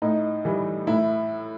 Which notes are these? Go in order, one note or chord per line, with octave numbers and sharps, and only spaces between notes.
A2 D#4
E3 G3
A2 E4